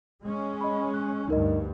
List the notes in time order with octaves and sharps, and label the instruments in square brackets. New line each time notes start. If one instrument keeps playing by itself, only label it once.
[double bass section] G#3 C#4
[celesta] D#5 B5
F#6
[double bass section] D2 G2 [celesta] D#4 A#4 D#5